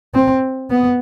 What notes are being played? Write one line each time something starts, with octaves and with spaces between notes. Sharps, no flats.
C4
B3